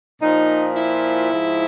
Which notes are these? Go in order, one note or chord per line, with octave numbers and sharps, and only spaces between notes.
A#2 F3 D#4
E4
G#2 F3